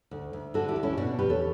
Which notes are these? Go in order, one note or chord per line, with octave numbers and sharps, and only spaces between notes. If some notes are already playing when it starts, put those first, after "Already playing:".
D2
D2
D3 F#4 A4
E4 G4
D2
C#4 E4
B2 D4 F#4
E2 G4 B4
A4 C#5